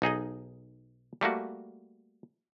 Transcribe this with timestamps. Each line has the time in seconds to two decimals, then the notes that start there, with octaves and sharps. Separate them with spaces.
0.02 B1 D#4 G#4 D#5
1.21 G3 A3 A#3 F#4